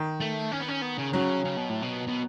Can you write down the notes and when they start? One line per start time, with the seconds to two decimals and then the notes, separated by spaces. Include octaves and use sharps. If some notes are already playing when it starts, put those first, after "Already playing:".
Already playing: D#3
0.20 A3
0.52 C#4
0.60 B3
0.69 C#4
0.82 B3
0.98 C#3
1.13 C#3 F#3
1.45 C#3
1.57 B2
1.70 A2
1.82 B2
2.08 B2